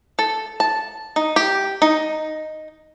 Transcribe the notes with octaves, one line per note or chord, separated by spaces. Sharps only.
A4
A5
D#4
G4
D#4